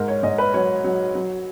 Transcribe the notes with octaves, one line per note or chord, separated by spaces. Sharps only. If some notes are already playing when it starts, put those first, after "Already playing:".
Already playing: G#2 A#4
C#5
G#2 D#5
B4
F#3 C#5
F#3
F#3